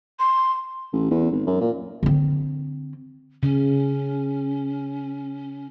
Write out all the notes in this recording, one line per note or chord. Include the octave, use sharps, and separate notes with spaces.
C6
A1
E2
G#1
F#2
A#2
D3 C4
C#3 C#4